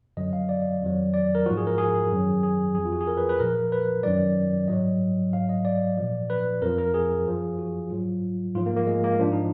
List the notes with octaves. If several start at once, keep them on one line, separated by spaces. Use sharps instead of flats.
F#2 D3 F#3 D#5
F5
D5
F2 D#3 F#3
D5
A#4
G#2 F3 F#4
G#4
A#4
G#4
F#2 D#3 F#3
G#4
F2 F3 G#4
F4
F#4
G#4
A#4
B4
B4
A#2 F3 A#4
B4
F#2 D#3 F#3 D5
G#2 F#3 D#5
G#2 F#3 F5
D#5
D5
A#2 F3
B4
F2 F3 A#4
A#4
G#4
F#2 F3
F#4
G#2 F#3 F4
G#2 F3 F4
A#3
A#3
G#3
A#3
G#2 F3 D4
D#4